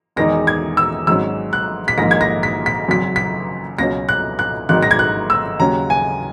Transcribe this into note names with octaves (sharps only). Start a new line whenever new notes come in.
E1 E2 D#3 G#3 D#4 A#6
G#6
E6
G#1 G#2 F#3 C#4 E6
F#6
B6
A#1 G#2 D#3 A#3 D#4 A#6
G#6
A#6
B6
B6
G#1 F#2 C#3 F#3 B6
B6
C#2 B2 F#3 C#4 A#6
F#6
F#6
G#1 G#2 D#3 F#3 F#6
A#6
G#6
F#6
E6
D#2 C#3 F#3 C#4 A#5
G#5